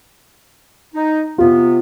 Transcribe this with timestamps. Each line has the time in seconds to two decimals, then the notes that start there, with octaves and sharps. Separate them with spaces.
0.94 D#4
1.38 C3 B3 F4